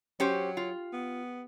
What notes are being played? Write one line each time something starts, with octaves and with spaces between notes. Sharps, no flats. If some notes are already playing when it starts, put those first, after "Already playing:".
F#3 C#4 G4 C5
F4
B3